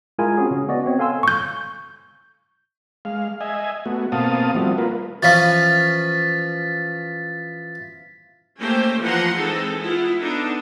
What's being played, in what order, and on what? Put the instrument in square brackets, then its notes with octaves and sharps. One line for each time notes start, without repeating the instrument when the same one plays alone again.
[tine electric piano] G#3 E4 F4 G#4 A#4 G#5
C4 C#4 F#4 G#4
C#3 C#4
B3 F#4 D5 D#5
B3 C4 C#5
A4 F5 G#5 C6 E6
[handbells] C#6 G6
[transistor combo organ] G#3 F5
D#5 E5 G#5
A3 B3 F#4
B2 A#3 C4 F5 A5 D#6
F3 G3 A3 C4 E4 F#4
A#3 F4 A#4 B4
[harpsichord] E3 F3 C#4 [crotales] A6 B6
[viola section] A3 A#3 C#4 G4 C5 G5
E3 F3 A#3 F#5 A#5 C6
E3 G#3 C4 D#4 A4
B3 E4 F4
B3 D4 D#4 A4